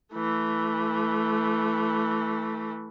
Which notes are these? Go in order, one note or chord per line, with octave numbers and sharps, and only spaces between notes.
E3 A3